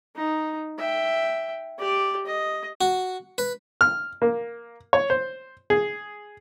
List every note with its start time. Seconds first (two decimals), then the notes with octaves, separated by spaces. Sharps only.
0.16 D#4
0.79 E5 G5
1.79 G4 D5
2.26 D#5
2.81 F#4
3.38 B4
3.81 F6
4.22 A#3
4.93 C#5
5.10 C5
5.70 G#4